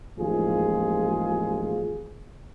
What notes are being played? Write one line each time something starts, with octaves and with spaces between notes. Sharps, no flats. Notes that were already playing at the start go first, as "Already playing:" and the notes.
A1 D#2 F3 G#3 F4 G#4